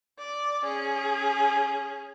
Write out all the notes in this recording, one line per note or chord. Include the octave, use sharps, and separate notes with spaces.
D5
C#4 G#4